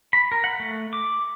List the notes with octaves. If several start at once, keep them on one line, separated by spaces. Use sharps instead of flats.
B5
A#4
F#5
A3
D6